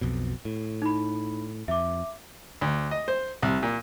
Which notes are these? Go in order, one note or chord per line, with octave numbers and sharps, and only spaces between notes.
B1 F2 B2
A2
D#4 B5
F2 E5 D6
D2
D#5
C5
C2
A#2